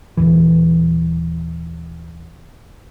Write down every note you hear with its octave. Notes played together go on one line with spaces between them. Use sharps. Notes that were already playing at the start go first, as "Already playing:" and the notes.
D#1 C#2 E3